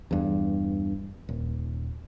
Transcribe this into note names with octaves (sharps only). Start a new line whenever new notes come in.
E2 G2
D#1